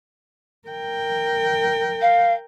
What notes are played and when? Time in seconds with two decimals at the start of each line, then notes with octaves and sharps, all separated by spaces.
0.68 A#4 G5
2.02 F5